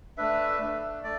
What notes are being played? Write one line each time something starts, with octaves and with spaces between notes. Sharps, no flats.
A3 D4 B4 E5
A3 D4
A3 D5